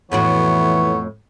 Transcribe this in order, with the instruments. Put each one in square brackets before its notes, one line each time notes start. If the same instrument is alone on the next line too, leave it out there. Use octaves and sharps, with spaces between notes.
[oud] F2 A2 F#4 [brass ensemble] E3 [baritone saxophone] B3 [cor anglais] C#5